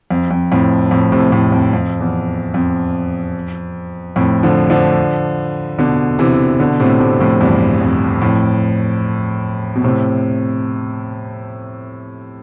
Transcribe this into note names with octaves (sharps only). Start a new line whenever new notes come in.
F2
F2
F2 A2
F2 A2
A2 C3
F2 A2
F2
F2
E2
F2
F2 A2
D3 F3
D3 F3
B2 D3
C3 E3
B2 D3
A2 C3
A2 C3
F2 A2
E2 G2
F2
F2 A2
B2
A2 C3